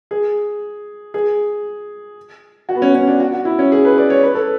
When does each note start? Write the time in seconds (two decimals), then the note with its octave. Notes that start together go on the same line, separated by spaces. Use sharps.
0.11 G#4
1.14 G#4
2.69 F#4
2.75 B3
2.82 C#4
2.95 C#4
3.07 D4
3.20 F#4
3.33 F#4
3.45 E4
3.59 C#4
3.72 G#4
3.85 B4
3.98 D5
4.10 C#5
4.23 B4
4.35 A4